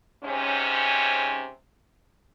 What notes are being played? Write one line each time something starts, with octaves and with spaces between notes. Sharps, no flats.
G#2 C3 C#4